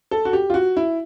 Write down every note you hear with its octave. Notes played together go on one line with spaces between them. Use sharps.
A4
F#4
G4
F4
F#4
E4